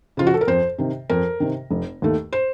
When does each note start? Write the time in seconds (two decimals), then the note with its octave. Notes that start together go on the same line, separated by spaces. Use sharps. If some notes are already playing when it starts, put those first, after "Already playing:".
0.17 C#3 F3 F4
0.27 F#4
0.34 A4
0.41 A#4
0.47 F2 C5
0.78 C3 D#3
1.10 F2 A#4
1.40 C3 D#3
1.71 F1
2.02 D#2 D#3 A3
2.33 C5